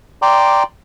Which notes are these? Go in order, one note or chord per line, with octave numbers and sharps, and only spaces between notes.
D5 G5 A#5 C6 D6